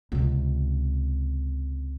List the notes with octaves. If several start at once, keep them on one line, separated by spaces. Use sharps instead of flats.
C#2 C3